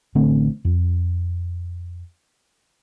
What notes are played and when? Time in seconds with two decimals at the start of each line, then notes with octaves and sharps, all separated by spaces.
0.15 A1 D3 A3 C4
0.65 F2